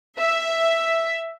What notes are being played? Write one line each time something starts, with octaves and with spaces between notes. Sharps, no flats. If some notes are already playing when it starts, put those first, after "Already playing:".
E5